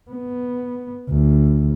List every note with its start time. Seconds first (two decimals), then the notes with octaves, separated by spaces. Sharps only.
0.11 B3
1.09 D2